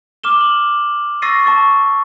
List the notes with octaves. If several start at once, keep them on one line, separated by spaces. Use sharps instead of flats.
D6 F6 E7 G7
F#7
C#6 E6 A6 A#6 C7 D#7
A5 C#6 A6